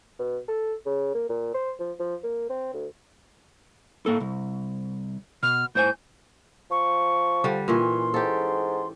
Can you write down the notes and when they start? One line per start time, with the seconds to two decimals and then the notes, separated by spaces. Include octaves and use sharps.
0.19 B2
0.48 A4
0.86 C#3
1.14 A#3
1.29 A#2
1.54 C5
1.79 F3
1.99 F3
2.23 A#3
2.49 C4
2.73 D2
4.06 A2 A#3 A4
4.20 C2
5.43 B2 F6
5.75 A2 C5 G#5 G6
6.71 F3 C#6
7.44 D3 G3
7.68 A#2 E3 C#4 C6
8.14 G#2 G4 A4